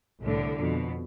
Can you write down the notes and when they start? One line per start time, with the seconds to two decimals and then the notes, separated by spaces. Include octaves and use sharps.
0.21 C2 A2 D3
0.59 F2 B2